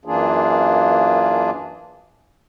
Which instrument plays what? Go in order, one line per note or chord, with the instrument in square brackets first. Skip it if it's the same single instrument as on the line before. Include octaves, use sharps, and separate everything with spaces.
[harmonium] F#2 E3 A#3 D4 F4 G#4